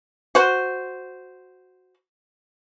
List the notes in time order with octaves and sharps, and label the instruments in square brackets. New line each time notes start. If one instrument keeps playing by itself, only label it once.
[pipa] F#4 C5